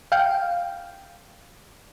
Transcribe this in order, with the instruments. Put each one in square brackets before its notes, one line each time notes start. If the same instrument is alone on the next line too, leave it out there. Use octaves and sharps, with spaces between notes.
[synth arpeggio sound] F5 G5